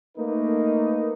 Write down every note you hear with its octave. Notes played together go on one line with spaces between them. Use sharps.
A3 A#3 D#4 B4